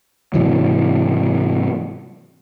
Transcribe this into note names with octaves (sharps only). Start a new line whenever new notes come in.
G#2 C3 E3 F#3